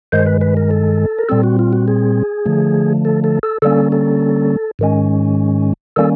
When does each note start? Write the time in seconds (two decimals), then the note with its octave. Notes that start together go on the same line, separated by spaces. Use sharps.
0.12 G2 D#3 G#3 C5
0.26 B4
0.41 B4
0.57 A#4
0.71 A4
1.18 A#4
1.29 A#2 G3 C4 A4
1.43 F#4
1.59 F4
1.73 F#4
1.88 G#4
2.45 D3 F3 A3
3.05 A4
3.24 A4
3.43 A4
3.62 D3 G3 A#3 C#4 A4
3.92 A4
4.79 G#2 D#3 G#3 C#4
5.96 D#3 G3 A#3 C#4 A4